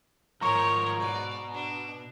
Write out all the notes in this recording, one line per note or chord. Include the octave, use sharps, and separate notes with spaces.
G#2 D#3 F3 A#4 C#5 A#5 C#6
B2 D5
D4